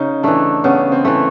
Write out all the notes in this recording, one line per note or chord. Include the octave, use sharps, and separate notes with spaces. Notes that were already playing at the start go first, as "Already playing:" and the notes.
Already playing: C#3 D#4
E3 A3 D4
C#3 B3
C4
E3 A3